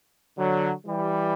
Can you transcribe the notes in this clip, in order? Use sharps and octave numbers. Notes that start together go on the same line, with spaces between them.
D3 F#3
E3 G3